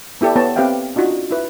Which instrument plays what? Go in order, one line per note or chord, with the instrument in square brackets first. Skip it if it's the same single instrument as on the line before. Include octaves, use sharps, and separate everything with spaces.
[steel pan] B3 E4 G4 A4 D5
B3 C#5 A5
C4 G4 B4 E5 F5 G5
D4 D#4 F4 F#4
E4 B4